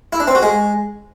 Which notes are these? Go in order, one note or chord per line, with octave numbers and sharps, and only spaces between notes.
E4
D4
C4
F#4
G#3